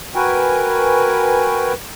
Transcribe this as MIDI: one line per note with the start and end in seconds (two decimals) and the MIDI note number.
0.15 1.73 66
0.15 1.73 70
0.15 1.73 71
0.15 1.73 79
0.15 1.73 80